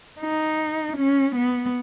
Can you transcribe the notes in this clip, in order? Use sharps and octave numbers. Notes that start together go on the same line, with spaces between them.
D#4
C#4
B3